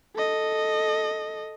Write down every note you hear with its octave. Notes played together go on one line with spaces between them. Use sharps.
A4 D#5